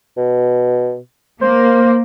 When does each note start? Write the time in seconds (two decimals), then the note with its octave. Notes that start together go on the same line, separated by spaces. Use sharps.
0.17 B2
1.41 A#3 C5